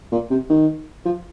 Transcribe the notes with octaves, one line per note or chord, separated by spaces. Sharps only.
A#2
C3
D#3
F3